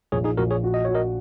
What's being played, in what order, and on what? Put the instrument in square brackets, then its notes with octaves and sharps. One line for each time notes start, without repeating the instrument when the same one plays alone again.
[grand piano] A#1 [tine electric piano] G#4 C#5
[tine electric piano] D#4 G#4
[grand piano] A#1 [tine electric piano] F#4 A#4
[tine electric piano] G#4 C#5
[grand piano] F#4
[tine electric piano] D#5
[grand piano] F#4 [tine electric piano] C#5
[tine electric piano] A#4 D#5